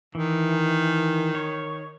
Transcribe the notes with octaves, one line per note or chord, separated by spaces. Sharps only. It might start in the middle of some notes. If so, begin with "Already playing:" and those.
D#3 E3
C#5